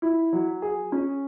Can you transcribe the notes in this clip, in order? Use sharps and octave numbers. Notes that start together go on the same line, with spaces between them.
E4
F#3
G#4
C#4